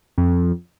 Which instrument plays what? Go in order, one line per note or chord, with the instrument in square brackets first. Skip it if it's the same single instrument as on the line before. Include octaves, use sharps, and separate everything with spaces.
[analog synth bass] F2